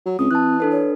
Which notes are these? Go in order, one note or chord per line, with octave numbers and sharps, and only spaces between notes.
F#3
C#2 C4 D#6
E3 A5 F#6
D4 A4 B4
C#5